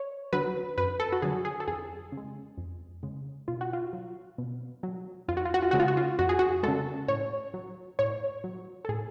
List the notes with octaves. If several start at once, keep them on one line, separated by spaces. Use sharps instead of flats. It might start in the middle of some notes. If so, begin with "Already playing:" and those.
Already playing: C#5
D3 F#3 B4
F#2 B4
A4
F#4
D3 F#3 G#4
G#4
A4
F2 G#4
C#3 G#3
F2
C#3 G#3
B2 F4
F#4
F4
F#3
B2
F#3
F2 F4
F#4
F4
F#4
F4
C#3 G#3 F#4
F4
F#4
F4
F2 F#4
G#4
F#4
C#3 G#3 A4
A2 C#5
F#3
A2 C#5
F#3
A4
A2 G#4